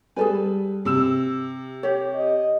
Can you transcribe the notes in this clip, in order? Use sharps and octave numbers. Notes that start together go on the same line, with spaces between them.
G3 G#4 A4 B4 G#5
C3 E6 E7
G4 C#5
D#5